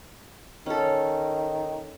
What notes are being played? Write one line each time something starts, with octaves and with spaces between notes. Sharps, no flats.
D#3 C#4 A4